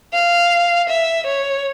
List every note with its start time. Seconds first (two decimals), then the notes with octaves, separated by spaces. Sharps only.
0.13 F5
0.89 E5
1.26 C#5